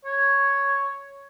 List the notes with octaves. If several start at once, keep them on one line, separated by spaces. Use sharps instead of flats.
C#5